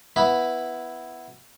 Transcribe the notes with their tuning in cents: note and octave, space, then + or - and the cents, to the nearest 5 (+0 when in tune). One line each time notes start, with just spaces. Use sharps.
B3 +0 E4 +0 B5 +0